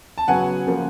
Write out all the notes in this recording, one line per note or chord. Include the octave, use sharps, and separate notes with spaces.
A5
C#3 F#3 B3 F#5 G#5
C#3 F3 A#3